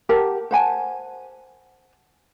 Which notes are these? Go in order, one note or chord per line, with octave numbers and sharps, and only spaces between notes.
G4 A#4 F#5 A5
C5 F#5 G#5 A5